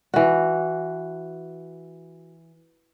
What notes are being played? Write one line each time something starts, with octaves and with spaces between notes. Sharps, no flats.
E3 F#4